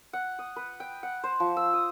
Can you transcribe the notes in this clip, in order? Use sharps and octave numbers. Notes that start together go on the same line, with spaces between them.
F#5
D#6
B4
G5
F#5
C5
F3
E6
D#6